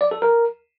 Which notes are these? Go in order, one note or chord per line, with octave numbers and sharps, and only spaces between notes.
D5
A4
A#4